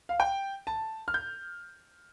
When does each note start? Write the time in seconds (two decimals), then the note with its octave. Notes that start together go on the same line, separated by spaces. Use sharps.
0.09 F5
0.20 G5
0.67 A5
1.08 F6
1.14 G6